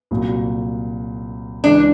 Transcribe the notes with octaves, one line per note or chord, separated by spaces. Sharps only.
C2 A#2 F#3
C#2 C#3 E3 D4